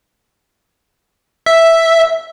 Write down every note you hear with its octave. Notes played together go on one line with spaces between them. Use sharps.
E5